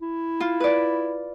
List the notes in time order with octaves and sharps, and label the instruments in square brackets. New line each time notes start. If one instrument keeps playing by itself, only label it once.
[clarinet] E4
[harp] F4
B4 D5